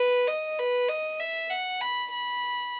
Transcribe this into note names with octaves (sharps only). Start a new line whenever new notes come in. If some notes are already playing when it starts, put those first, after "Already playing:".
Already playing: B4
D#5
B4
D#5
E5
F#5
B5
B5